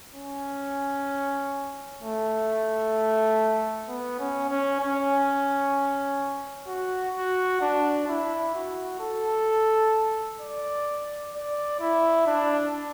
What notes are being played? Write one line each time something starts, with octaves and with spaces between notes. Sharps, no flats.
C#4
A3
B3
C#4
C#4
C#4
F#4
F#4
D4
E4
F#4
A4
D5
D5
E4
D4